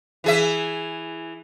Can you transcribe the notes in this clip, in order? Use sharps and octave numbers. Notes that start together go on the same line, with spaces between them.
E3 G#4 E5